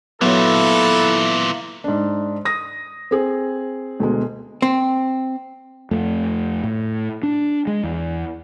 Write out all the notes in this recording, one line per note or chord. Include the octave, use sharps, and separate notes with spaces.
A#2 E3 F#3 B3 E4 A4 E5 F5
G#2 D4
D#6 A#6
C4 G#4
D2 B2 G#3
C4
F2 A3
A2
D4
G#3
E2